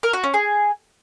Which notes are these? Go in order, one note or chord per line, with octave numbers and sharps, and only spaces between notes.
A#4
F#4
C#4
G#4